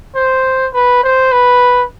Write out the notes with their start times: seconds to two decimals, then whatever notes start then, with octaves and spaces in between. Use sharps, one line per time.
0.15 C5
0.74 B4
1.03 C5
1.32 B4